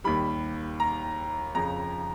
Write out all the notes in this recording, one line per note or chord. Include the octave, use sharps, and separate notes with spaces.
D#2 D#3 G3 B5
A#5
F2 C#3 F3 A#5